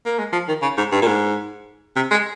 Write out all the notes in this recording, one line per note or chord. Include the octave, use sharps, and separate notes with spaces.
A#3
G#3
F3
D#3
C#3
G#2
G2
A#2
G#2
C3
G#3